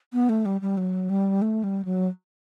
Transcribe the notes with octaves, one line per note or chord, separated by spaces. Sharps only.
B3
A3
G3
G3
F#3
G3
A3
G3
F#3